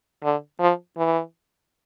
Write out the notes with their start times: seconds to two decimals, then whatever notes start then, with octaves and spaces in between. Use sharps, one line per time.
0.23 D3
0.60 F3
0.97 E3